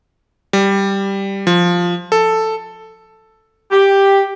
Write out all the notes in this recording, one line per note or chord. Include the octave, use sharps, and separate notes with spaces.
G3
F3
A4
G4